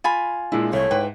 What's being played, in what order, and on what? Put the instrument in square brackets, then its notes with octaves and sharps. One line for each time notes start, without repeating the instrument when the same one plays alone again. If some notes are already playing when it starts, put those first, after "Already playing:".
[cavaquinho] F4 G#5 B5
[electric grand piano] A#2 G#3 D4 [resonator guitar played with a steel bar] E4
[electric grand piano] C2 [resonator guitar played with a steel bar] A3 [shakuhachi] C#5
[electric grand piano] G#2 [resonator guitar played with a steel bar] B4 G5